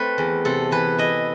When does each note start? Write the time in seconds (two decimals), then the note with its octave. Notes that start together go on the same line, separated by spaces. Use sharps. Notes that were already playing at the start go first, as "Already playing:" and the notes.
Already playing: A3 C4 B4
0.18 E2
0.45 C3 A4
0.71 E3 B4
0.98 E4 D#5